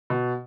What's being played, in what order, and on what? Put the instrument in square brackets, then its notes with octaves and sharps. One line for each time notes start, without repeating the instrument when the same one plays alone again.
[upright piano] B2